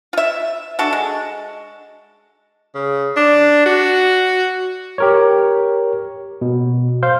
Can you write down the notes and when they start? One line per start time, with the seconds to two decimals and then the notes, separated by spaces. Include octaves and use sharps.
0.13 F4 E5
0.79 D4 F#4 A4
0.93 G#3
2.75 C#3
3.17 D4
3.66 F#4
4.98 G4 A#4 C#5
6.41 B2
7.03 C5 F5 G6